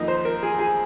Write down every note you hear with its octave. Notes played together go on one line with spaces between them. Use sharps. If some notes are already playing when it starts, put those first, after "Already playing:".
Already playing: F2 D#3 A#3 D#5
C5
A#4
G#4
G#4